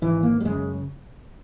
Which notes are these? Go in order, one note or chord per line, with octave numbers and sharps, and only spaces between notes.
G#1 E3
A#3
G3
F#2 C#3 G#3